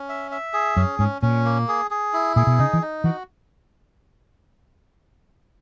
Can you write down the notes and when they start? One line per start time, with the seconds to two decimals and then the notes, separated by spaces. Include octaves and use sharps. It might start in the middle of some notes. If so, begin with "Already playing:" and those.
Already playing: C#4
0.09 E5
0.31 E5
0.53 G#4
0.76 F#2 C#4
0.99 G#2 C#4
1.22 A#2 C#4
1.45 A#3
1.68 G#4
1.91 G#4
2.13 E4
2.36 A#2 G#4
2.47 B2
2.58 C#3 D#4
2.73 E3
2.82 D#4
3.04 E3 F#4